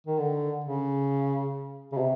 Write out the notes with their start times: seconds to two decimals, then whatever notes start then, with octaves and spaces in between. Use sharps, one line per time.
0.07 D#3
0.19 D3
0.64 C#3
1.92 C#3
1.98 C3